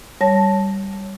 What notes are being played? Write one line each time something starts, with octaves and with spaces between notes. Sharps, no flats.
G3 C#5 A5 A#6